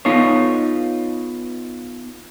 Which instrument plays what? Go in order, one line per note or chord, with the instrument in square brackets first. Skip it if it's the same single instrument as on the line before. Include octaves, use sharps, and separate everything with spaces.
[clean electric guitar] B3 D#4 F4 A4 C#5